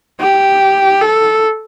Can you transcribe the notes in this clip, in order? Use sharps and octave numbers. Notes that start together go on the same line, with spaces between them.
G4
A4